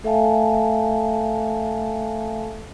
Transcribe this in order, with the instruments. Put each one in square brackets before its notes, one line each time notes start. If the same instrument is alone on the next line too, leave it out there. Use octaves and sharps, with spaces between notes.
[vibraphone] A3 A4 E5 F5 G#5 A5